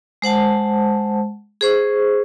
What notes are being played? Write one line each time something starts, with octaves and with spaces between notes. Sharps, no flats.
G#3 C5 F#5 A5
G#4 C5 C#6